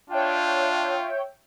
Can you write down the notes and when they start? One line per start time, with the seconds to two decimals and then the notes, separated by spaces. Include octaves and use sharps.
0.10 D4 F4 C#5 E5 G5